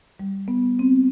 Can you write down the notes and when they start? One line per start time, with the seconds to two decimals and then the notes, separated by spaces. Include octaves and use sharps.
0.19 G3
0.48 B3
0.79 C4